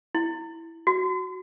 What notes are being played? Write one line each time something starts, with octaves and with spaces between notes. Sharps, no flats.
E4
F#4